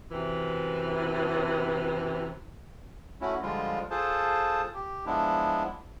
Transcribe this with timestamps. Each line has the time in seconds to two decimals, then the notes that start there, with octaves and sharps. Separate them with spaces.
0.11 F#2 C3 E3
3.21 A3 C#4 E4 F#4
3.42 D3 F3 G3 G#3 F4
3.91 F4 G#4 A4 C5 A5
4.74 G4
5.06 F3 G#3 B3 D4 E4